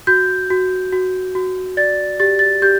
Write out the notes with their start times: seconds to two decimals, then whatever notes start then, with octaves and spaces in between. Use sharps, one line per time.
0.07 F#4 G6
0.50 F#4
0.93 F#4
1.35 F#4
1.77 D5 A6
2.20 G4 A6
2.39 A6
2.62 G4 G6